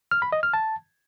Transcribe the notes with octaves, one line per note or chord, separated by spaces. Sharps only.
F6
B5
D#5
F6
A5